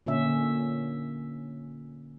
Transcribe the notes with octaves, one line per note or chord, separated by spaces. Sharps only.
A#2 D3 C#4 E5